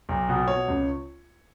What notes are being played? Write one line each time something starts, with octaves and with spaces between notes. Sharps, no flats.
B1
B2
B2 C#5
C#2